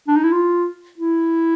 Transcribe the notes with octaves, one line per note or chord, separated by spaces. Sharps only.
D4
D#4
E4
F4
E4